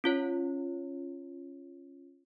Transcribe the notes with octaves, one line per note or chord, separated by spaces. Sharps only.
C#4 F4 C#5